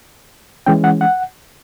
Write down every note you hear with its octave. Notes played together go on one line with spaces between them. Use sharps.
E3 G#3 C#4 G5
F#5
F#5